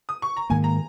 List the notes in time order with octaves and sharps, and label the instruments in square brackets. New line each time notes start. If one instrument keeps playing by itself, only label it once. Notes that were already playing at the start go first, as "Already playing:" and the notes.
[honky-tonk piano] D#6
C#6
A#5
[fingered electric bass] G#2 D#3 A#3 [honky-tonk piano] G#5
[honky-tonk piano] A#5